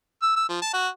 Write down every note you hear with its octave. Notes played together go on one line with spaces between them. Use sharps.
E6
E6
F3
A5
F#4